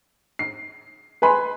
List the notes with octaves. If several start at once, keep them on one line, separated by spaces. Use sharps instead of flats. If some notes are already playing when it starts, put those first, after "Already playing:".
C7
B4 G#5 B5 C6